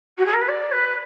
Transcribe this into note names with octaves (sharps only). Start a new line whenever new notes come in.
F#4
G#4
A#4
B4
D5
B4